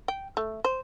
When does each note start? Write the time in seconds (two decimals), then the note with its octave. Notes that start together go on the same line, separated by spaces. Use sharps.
0.08 G5
0.37 A3
0.64 C5